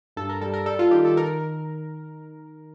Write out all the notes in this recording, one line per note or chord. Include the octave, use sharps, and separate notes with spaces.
G2 A4
A#4
G3 A4
A#4
G3 A4
F4
D#3 G4
A4
A#4